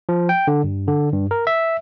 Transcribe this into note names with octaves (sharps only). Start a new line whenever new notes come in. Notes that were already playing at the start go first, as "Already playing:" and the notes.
F3
G5
D3
G2
D3
G2
A#4
E5